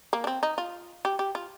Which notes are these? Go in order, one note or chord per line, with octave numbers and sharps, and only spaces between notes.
A#3
D4
C4
D#4
F4
G4
G4
F4